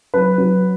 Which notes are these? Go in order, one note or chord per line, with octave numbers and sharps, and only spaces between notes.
F#3 B4
F#3